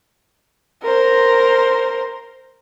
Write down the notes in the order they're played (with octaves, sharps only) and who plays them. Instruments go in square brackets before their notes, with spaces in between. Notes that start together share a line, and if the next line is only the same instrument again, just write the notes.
[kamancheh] A#4 C5